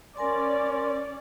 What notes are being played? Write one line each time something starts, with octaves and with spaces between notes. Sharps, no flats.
C#4 A#4 D5 G#5 C6